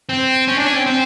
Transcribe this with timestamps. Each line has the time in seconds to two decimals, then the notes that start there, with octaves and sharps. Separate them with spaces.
0.09 C4
0.48 C#4
0.57 D4
0.66 C#4
0.76 C4
0.86 C4